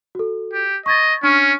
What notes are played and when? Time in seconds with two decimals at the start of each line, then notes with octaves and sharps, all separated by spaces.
0.15 F#4 A4
0.53 G4
0.86 D#5 C#6 G#6 A6
1.23 C#4 D4 C#6 F6